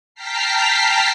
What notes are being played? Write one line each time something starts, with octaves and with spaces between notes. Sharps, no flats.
G5 A5 A#5 F6 B6 C7